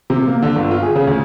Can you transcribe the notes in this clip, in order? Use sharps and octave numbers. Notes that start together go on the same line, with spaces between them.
C3
A#3
D3
G1
F4
G#4
C#3
D2